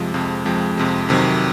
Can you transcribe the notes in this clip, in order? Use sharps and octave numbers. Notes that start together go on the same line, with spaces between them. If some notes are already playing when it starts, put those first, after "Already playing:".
Already playing: F2 C3 F3 G#3
F2 C3 F3 G#3
F2 C3 F3 G#3
F2 C3 F3 G#3
F2 C3 D#3 F#3